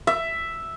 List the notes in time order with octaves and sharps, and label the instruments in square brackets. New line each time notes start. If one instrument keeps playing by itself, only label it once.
[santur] E5